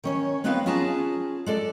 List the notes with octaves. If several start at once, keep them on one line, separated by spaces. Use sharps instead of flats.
D#3 C#4 C#5
G#3 B3 C4 D#4 B4 F5
C#4 F4 G#4 A5 A#5
G#3 A4 D5